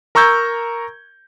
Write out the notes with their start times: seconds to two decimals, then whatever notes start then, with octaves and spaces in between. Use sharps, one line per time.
0.15 A#4 A#5 C#6 E6 G6 G#6